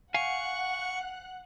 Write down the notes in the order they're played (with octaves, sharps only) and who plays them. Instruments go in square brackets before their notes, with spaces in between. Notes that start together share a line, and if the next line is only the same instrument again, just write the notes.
[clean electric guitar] F5 G#5 [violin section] F#5 F#6 [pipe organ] C#6